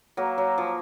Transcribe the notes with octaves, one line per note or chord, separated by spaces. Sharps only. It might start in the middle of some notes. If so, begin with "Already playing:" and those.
F#3 A#3
F#3
F3